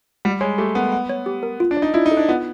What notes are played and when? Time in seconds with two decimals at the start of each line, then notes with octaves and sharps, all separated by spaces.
0.25 G3 F#5
0.41 G#3 C#5
0.58 A3 G4
0.75 B3 A#4
0.92 F#5
1.09 C#5
1.26 G4
1.43 A#4
1.60 F4
1.71 D4
1.77 D5
1.82 D#4
1.94 E4 F4
2.06 D#4
2.11 A4
2.17 D4
2.29 B3 F4